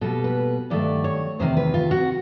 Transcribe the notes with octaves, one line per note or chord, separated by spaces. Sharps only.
B2 G3 A#3 A4
B4
G2 D#3 F#3 A3 D5
C#5
E2 C3 D#3 C5
B4
F4
F#4